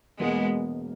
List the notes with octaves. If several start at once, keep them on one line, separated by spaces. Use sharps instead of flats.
E1 E2 B2 G#3 A#3 B3